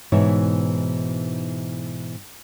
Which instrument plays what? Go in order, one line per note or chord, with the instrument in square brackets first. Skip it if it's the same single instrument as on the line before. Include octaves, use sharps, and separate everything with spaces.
[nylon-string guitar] G#2 B2 E3 D#4 E4 C#5